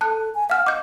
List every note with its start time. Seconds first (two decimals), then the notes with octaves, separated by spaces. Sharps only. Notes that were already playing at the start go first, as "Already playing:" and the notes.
0.01 A4 A5 F#6
0.34 G#5
0.50 F5 F#5 F6
0.66 D#5 D6 G6